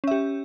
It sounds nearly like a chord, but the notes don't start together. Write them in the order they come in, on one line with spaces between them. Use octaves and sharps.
C#4 E5 G4